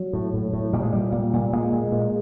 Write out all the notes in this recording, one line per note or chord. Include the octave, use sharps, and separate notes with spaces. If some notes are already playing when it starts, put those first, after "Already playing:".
Already playing: F#3
A2
A2
A2
A#2 G3
G#3
A#2 G3
A#2
A#2
A#2 G#3
A#2
A#2